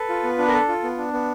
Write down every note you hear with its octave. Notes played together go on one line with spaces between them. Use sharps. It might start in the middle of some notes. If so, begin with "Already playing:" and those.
Already playing: A4 B4
F4
B3
D4
A#4
A4
F4
B3
D4
B3